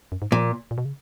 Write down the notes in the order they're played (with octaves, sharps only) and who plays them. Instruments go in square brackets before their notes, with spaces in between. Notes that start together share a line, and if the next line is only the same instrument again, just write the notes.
[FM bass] F#2
G#2
[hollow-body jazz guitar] A#2 [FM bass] F3
[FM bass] A#2
B2
C#3